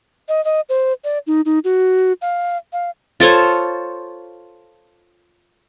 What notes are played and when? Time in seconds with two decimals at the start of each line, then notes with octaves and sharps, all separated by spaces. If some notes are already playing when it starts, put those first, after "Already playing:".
0.28 D#5
0.45 D#5
0.69 C5
1.04 D5
1.27 D#4
1.45 D#4
1.64 F#4
2.21 F5
2.73 F5
3.20 F4 A4 C5 C#5